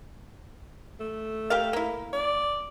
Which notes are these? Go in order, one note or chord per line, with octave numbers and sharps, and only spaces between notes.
A3
G4 A#4 F5
A#3 E4
D5